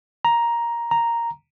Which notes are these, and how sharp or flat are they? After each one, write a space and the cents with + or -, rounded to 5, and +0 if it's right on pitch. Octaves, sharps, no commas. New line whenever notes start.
A#5 +10
A#5 +0